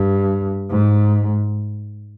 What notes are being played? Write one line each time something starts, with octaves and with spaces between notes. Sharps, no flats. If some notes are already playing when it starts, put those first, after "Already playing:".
Already playing: G2
G#2